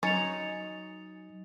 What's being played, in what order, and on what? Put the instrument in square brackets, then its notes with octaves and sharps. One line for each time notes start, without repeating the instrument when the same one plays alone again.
[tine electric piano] F#3 [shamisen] C#4 [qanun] D#4 [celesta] A6 C#7 F7